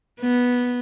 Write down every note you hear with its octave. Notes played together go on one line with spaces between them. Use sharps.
B3